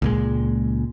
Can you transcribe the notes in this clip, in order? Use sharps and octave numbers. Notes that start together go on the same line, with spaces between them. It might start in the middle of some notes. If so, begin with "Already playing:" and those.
C#2 A#2 G#3